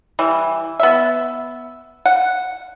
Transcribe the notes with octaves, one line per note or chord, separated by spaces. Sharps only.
E3 G3
B3 E5
F#5